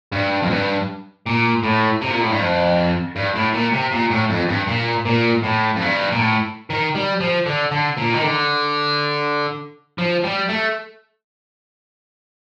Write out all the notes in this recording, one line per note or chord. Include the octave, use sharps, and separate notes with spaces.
G2
F2
G2
A#2
A2
C3
A#2
A2
G2
F2
G2
A2
A#2
C3
A#2
A2
F2
G2
A#2
A#2
A2
F2
G2
A#2
A2
D#3
G3
F3
D3
D3
A#2
D#3
D3
F3
G3
A3